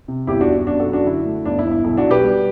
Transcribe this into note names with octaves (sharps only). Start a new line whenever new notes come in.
C3
G1 E4 G4
D4 F#4
G1
F#2 D4 F#4
F#4 A4
F#2
D4 F#4
D3 E4
A3
G1 D4
E4
G1
E4
B1 E4
D4 F#4
B1
G4 B4
G3